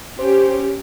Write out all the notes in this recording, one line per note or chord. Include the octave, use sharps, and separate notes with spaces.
C#4 G4 C5